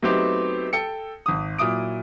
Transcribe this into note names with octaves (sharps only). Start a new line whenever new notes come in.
F#3 A3 B3 C4 D#4 G4
A4 G5 C#7
G#1 D#6
A#2 F#3 E4 D#6 D7